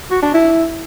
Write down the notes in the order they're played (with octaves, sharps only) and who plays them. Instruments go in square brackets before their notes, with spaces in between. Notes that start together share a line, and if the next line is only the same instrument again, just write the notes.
[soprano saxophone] F#4
D4
E4